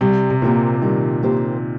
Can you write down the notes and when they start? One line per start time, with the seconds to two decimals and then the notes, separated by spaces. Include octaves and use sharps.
0.01 C3 G3
0.31 C3
0.42 A#2 A#3 G4 C5
0.82 D#3 G3
1.23 A#3 G4 C5